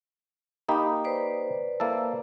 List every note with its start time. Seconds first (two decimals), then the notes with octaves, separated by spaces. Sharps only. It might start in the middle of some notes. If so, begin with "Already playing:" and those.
0.68 A#3 D#4 G4 B5 D#6
1.04 B4 C5 D5
1.80 A#3 E4 A4